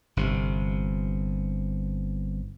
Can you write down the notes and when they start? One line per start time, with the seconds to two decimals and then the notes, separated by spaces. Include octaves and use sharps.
0.17 G1 C3